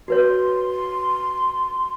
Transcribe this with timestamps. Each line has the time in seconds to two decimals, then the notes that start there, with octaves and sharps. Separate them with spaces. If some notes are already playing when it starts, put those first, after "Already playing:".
0.08 F#4 B4 C#5 C6